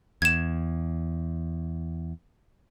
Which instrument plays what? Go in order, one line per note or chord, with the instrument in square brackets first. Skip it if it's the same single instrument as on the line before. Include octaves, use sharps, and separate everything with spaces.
[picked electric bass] E2 [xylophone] G#6 E7